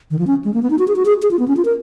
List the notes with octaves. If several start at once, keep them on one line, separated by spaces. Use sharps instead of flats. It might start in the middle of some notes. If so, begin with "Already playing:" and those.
D#3
F3
C#4
G#3
A#3
B3
D#4
F#4
G#4
F#4
G#4
G#4
F4
B3
C#4
F4
A#4